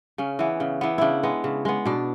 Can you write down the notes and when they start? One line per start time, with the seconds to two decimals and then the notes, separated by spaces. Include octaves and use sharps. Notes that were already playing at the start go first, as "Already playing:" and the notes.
0.18 C#3 C#4
0.39 E3 B3
0.60 C#3
0.81 E3 B3
0.98 C#3 D4 E4
1.23 G#3 B3
1.44 C#3
1.65 G#3 B3
1.85 B2 D4